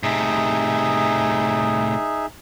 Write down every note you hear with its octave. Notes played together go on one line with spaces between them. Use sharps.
A2 C3 D#4 G#4 E5